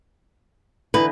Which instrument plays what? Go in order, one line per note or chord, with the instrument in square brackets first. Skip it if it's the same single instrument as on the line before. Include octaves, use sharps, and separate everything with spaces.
[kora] D3 E3 D#4 [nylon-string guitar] B4